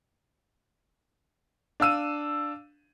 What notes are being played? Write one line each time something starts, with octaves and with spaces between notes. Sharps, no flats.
D4 F5 E6 D#7